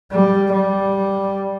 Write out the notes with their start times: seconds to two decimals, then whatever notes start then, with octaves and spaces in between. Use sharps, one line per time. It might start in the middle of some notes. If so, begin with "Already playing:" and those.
0.12 G3
0.52 G3